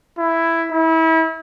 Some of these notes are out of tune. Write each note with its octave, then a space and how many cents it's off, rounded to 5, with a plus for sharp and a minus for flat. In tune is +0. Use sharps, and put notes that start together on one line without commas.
E4 +5
E4 -30